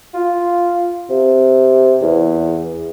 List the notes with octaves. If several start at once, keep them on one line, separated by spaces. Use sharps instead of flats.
F4
C3
E2